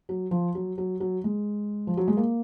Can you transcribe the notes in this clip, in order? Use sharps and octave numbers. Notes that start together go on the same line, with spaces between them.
F#3
F3
F#3
F#3
F#3
G#3
F3
F#3
G#3
A#3